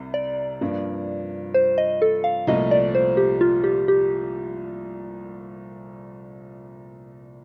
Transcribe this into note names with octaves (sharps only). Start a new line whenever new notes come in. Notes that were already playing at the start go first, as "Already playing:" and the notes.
Already playing: C2 C3
D5
G2 F3 A#3 D4
C5
D#5
A4
F5
C2 A#2 F3 A3 D#5
D5
C5
G4
F4
G4
G4